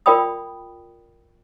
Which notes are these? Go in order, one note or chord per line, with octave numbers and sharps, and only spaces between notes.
F4 A#4 D5 G5 B5 D#6